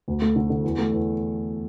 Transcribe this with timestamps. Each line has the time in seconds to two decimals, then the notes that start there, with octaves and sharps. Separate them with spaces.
0.08 D2
0.22 A3
0.36 D3
0.50 D3
0.63 E2
0.79 A3
0.92 E2